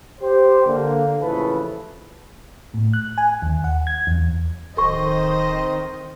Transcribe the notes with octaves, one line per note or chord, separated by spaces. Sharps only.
G4 C5
D3 A#3
A1 C#3 E3 F3 A4 B4
A2
F#6
G#5
D#2
F#5
G#6
E2
D1 D#3 C4 A4 C5 D#5 C#6